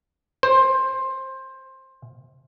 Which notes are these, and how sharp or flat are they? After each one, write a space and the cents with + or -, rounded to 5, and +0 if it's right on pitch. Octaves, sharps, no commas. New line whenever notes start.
C5 +15